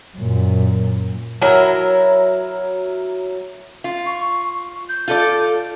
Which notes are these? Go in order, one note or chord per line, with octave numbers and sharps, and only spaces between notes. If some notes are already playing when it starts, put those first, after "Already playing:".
F#2 A#2
F#3 E4 A#4
F4
C#6
G6
F4 A4 D5